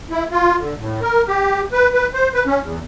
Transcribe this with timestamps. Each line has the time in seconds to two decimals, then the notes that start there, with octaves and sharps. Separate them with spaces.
0.11 E4
0.32 F4
0.59 D3
0.79 A2
1.01 A#4
1.28 G4
1.73 B4
1.93 B4
2.14 C5
2.34 B4
2.46 C#4
2.61 E2